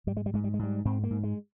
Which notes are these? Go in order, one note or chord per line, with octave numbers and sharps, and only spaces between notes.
G#2 G3
G#3
G3
G#2 G#3
G3
G#3
G#2 G3
G#2 C4
A#3
G#2
G#3